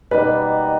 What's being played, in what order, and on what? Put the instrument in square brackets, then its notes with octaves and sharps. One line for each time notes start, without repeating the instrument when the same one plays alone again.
[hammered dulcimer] B2 G3 A#3 D#4 [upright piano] B4